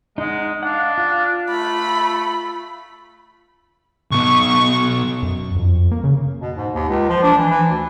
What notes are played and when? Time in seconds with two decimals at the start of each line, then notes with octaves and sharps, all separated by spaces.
0.18 G#3 D#4 F#5
0.63 D4 F5 F#5
0.98 F4
1.51 A3 B5
4.11 B1 B2 C#6
5.23 F#2
5.56 F2
5.92 A#3
6.04 C#3
6.42 B2
6.57 G#2
6.74 D#2
6.89 C#2
7.09 F3
7.23 D4
7.37 E3
7.50 E3
7.71 D2